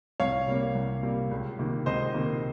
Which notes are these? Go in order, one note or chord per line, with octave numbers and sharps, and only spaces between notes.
C2 C#5 F5
C3 G3 A#3
C2
C3 G3 A#3
C#2
C3 D#3 A#3
C#2 C5 D#5
C3 D#3 A#3